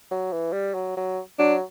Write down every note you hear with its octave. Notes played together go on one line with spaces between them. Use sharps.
F#3
E3
G3
F#3
F#3
F#3 D4